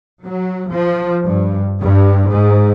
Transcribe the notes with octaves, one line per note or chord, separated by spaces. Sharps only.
F#3
F3
G2
G2
G#2